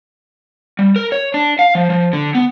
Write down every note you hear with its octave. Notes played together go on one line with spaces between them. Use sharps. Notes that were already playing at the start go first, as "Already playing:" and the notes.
G3
A#4
C#5
D4
F5
F3
F3
D3
B3